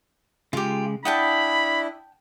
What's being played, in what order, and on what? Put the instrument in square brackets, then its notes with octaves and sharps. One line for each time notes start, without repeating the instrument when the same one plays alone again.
[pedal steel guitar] C#3 G#3 [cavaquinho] F4 G4
[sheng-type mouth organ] D4 E4 [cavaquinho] F#5 G5 A5 [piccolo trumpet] B5 [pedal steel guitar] D#6